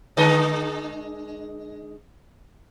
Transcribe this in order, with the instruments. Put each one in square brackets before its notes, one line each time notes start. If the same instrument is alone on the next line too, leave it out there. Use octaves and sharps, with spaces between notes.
[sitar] D3 G#3 D#5